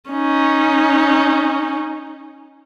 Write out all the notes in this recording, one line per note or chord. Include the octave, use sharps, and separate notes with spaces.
C#4 D#4